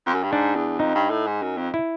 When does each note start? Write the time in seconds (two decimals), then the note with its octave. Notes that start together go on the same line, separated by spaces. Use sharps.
0.06 F2
0.14 F#2
0.23 G2
0.32 G#2 D4
0.56 E2
0.79 F2 D#4
0.95 G2
1.10 A2
1.27 G#2
1.42 F#2
1.57 F2
1.74 E4